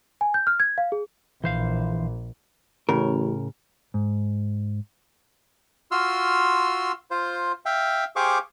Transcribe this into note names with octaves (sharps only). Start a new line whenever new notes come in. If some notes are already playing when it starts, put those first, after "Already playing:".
G#5
G6
F6
G#6
F5
G#4
A#1 E3 C5 F5
A1 A2 C#3 A#4
G#2
F4 F#4 C6 E6 F6
F4 C5
E5 F5 G5
G4 G#4 C5 F5 C#6 D6